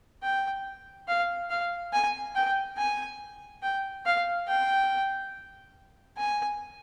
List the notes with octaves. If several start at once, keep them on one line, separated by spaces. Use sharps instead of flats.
G5
F5
F5
G#5
G5
G#5
G5
F5
G5
G#5